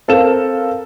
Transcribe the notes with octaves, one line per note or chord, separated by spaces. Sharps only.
C4 A4 A#4 F5 E7